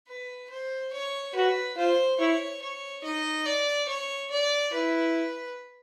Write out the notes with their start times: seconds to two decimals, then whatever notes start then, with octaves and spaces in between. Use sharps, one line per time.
0.08 B4
0.50 C5
0.93 C#5
1.35 F#4 B4
1.77 F4 C5
2.20 E4 C#5
2.62 C#5
3.04 D#4 D#5
3.46 D5
3.89 C#5
4.31 D5
4.73 E4 B4